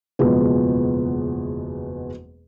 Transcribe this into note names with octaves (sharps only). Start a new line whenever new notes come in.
F#1 E2 B2 F3 G#3 B3